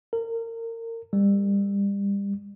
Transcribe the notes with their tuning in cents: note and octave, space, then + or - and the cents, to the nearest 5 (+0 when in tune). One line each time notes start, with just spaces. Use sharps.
A#4 -30
G3 +30